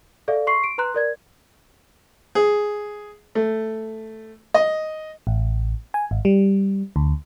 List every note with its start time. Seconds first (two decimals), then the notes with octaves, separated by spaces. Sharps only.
0.28 G#4 A4 D5 E5 F5
0.47 C6 C#6 C7
0.64 D7
0.78 B4 A#5 C6 F#6
0.95 A#4 D5 G#6
2.35 G#4
3.35 A3
4.54 D#5
5.27 A1
5.94 G#5
6.11 G#1
6.25 G3
6.96 D2